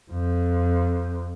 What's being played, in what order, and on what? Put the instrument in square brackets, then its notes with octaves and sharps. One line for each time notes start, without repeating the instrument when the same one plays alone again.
[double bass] F2